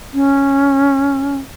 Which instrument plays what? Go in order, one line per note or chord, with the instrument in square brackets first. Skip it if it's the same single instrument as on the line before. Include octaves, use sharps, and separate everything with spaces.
[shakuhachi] C#4